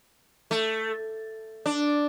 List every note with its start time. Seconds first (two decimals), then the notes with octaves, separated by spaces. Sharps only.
0.51 A3
1.66 D4